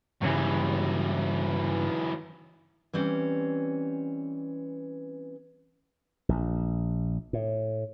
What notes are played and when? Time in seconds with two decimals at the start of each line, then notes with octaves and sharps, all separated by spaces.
0.22 G2 C#3 E3 F#3 G3
2.93 E3 G3 C4 C#4
6.29 A#1
7.33 A2